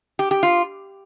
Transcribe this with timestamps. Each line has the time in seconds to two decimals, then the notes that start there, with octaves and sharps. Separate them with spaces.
0.19 G4
0.31 G4
0.43 F4